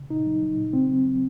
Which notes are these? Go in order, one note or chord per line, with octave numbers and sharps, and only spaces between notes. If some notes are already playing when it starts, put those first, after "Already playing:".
Already playing: C#3
A#2 D#4
F#3
F#3
A#2
C#3 C4
F#3
F#3